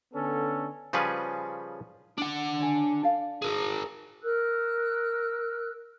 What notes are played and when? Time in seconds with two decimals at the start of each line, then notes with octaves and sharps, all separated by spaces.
0.14 D3 B3 C#4 A4
0.93 C#3 F3 G3 C#4 G#4 B4
2.18 D4 F#5
2.60 C#5 G#5
3.02 A4 D5 F5
3.42 G#4 A#4
4.22 A#4 E6 F#6